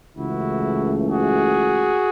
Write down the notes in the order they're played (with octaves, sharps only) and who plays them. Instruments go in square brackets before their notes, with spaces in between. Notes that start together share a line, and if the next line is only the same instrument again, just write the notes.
[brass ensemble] C#2 C#3 E3 A3 E4 F#4
F#4 G#4